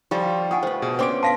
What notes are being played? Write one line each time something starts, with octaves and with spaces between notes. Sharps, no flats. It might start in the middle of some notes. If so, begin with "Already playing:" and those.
F3 G3 D4 F4 A4 F5 C#6
D4 F4 F#5 G#5 C#6 D#6
A3 B4 C5
B2 G#4
B3 C#4 D4 C5 G5 C6 D6 D7
F5 A5 C6 A#6 B6